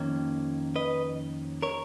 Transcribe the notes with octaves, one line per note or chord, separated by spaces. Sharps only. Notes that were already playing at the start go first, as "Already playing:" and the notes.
Already playing: F2 D#3 A#3 C#4
B4 D#5
A#4 C#5